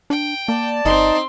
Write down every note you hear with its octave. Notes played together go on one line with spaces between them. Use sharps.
D4 G5
A#3 D5 A5
G1 C4 D#4 C6